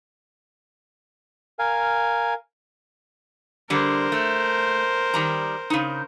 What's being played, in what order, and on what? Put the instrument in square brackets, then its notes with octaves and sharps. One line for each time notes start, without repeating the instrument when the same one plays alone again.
[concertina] A#4 F5 G#5
[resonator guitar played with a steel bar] D3 G3 [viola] A#4 C5
[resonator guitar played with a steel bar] A3
D#3 G3 A#5
C#3 D#4